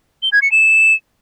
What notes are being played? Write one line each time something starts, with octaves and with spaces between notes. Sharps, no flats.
G7
G#6
C#7
E7